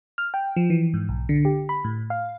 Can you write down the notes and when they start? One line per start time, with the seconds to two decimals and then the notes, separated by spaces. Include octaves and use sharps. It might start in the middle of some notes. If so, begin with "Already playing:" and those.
0.18 F6
0.34 G5
0.56 F3
0.70 E3
0.94 G#2
1.09 B1
1.29 D3
1.45 G4
1.69 B5
1.85 A2
2.10 F5